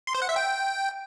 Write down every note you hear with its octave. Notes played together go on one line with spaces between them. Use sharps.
C6
C5
F#5
E5
G5